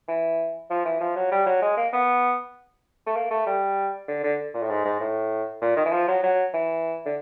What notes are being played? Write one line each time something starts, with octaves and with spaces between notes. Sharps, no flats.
E3
F3
E3
F3
F#3
G3
F#3
G#3
A#3
B3
A3
A#3
A3
G3
D3
D3
A#2
A2
G#2
G#2
A2
A#2
D#3
E3
F3
F#3
F#3
E3
D3